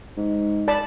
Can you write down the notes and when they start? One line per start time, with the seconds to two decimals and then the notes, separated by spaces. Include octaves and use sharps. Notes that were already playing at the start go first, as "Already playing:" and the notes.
0.17 G#2
0.68 D5 A5 B5